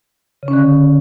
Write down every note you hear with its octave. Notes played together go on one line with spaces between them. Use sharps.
C#3
C#4
D3